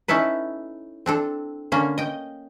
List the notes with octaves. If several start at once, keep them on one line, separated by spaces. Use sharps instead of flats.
C#4 D#4 E4 A4 B4
C4 D4 A4
D3 A#3 C#4
D#5 G5